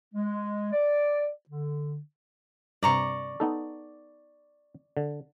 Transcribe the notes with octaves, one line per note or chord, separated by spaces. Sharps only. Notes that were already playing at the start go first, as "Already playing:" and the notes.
G#3
D5
D3
G2 C3 D5 A#5 C#6
B3 D#4 A4
D3